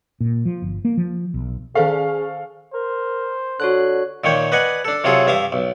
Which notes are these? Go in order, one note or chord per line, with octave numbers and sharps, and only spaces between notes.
A#2
F3
G1
A#3
F3
B1
D#3 G#4 A4 C5 F5 C#6
A#4 C5
D3 F#4 C#5 F#6
A#2 D#3 A#3 C#5 G5
B4 D5 D#5 F#5 G#5
D4 A4
C3 F#3 F4 G#4 A4
G2 E5 F5 D6 D#6
B1